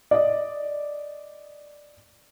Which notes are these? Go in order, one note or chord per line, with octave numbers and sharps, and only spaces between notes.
D5 D#5